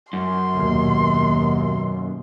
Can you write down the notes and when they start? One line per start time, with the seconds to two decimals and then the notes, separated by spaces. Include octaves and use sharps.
0.13 F#2 C6
0.54 D#2 B2